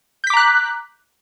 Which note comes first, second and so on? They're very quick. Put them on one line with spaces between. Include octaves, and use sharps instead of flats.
G6 B6 D6 A#5 F#6